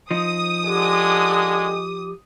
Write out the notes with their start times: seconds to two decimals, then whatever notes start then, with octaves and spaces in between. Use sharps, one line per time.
0.11 F3 D#4 D#6
0.64 D3 G#3 G4